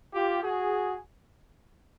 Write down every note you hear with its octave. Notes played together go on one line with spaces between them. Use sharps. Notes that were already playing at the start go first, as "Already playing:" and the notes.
F4 G4
F#4 G#4